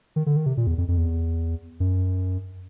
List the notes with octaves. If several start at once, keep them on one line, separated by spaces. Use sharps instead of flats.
D#3
D3
D#3
C3
A#2
E2
F2
F2
E2
F#2